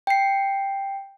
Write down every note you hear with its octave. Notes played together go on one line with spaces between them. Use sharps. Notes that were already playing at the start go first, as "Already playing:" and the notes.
G5 C7